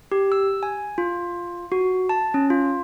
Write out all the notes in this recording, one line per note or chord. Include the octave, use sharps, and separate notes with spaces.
G4
E6
G#5
F4
F#4
A5
C#4
F4